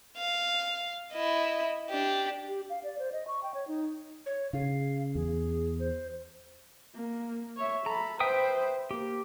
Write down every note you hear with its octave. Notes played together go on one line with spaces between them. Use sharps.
F5
E4 D#5
D4 G4
G4
F5
D5
C5
D#5
C#6
G5
C#5
D#4
C#5
C#3 F5
E2 G#4
C5
A#3
C#5 E5
A4 A#5 B5
B4 C5 E5 G5 D#6
A#3 G4